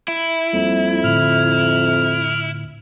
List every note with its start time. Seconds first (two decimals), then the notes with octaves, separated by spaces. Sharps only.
0.08 E4
0.53 F2 G3 A#3
1.04 A2 D3 F6